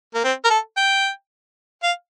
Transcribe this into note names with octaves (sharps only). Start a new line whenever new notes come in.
A#3
C4
A#4
A4
G5
F5